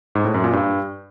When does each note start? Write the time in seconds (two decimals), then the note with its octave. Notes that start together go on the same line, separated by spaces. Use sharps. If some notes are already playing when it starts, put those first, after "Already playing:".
0.15 G#2
0.25 A2
0.34 F#2
0.44 A#2
0.53 G2